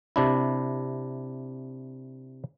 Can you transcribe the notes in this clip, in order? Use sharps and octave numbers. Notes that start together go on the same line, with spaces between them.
C3 D4 E4